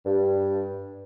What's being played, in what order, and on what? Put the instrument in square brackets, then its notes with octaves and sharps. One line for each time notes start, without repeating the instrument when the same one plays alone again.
[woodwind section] G2